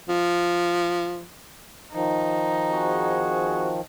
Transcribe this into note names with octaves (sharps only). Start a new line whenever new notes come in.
F3
D#3 F3 D#4
C4 F#4 G#4